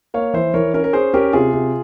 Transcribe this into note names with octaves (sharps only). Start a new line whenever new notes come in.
A#3 C#5 F5
E3 C5 E5
E3 A#4 C#5
C#4 A#4 C#5
A#4
C#4 G#4 C5
C#4 G4 A#4
C3 F4 G#4
C3